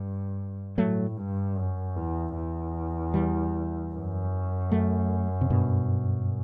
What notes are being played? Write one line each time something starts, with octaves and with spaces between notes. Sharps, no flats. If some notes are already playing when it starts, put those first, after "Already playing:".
Already playing: G2
A2 F#3 A3
G2
F#2
E2
E2
E3 G3
F#2
F#3 A3
C3
G2 B2